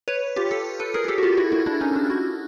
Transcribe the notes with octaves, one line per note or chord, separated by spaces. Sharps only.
B4 C#5
F4 G4
G4 A4
A4 B4
G#4 A#4
G#4
G4 A4
F#4
F4 G4
E4 F#4
E4 F#4
D4 E4
C#4 D#4
D4
E4 F#4